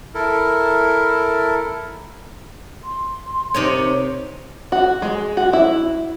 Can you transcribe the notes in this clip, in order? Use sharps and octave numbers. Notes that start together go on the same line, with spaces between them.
E4 A4 A#4
C6
C3 D#4 C#5
F#4
G#3
F#4
E4